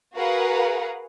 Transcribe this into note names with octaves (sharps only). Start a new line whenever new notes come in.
F#4 G#4 A#4 B4 F5 F#5